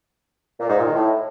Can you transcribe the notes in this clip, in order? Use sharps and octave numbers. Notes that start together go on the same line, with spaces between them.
A#2
G#2
A#2
D#3
A2